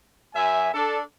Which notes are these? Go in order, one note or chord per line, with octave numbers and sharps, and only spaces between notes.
F#2 E5 G#5
D4 A4